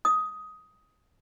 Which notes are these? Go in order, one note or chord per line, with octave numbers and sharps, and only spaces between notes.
D#6